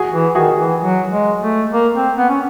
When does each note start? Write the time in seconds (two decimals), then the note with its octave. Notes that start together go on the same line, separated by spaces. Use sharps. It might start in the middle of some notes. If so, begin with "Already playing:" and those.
Already playing: F#4 G#4
0.13 E3
0.35 D#3 F#4 G#4
0.58 E3
0.81 F#3
1.11 G#3
1.41 A3
1.72 A#3
1.95 C4
2.17 B3
2.29 C#4